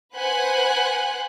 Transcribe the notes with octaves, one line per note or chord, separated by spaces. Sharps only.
B4 C5 F#5 G#5 F#6